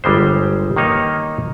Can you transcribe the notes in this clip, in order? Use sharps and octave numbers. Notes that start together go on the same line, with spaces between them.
G1 G3 G#3 C5
D#3 A#3 D#4 C#5